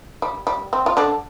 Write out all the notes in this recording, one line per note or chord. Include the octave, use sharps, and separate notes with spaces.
G3
G3
C4
F4
D3 D4